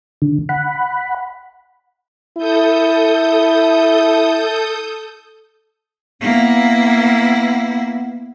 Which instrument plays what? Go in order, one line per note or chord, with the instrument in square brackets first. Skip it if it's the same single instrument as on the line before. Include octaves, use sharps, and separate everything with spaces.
[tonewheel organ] D3
F#5 B5
[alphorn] E4 [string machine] A4 D#6 G6
[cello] A#3 E4 [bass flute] B3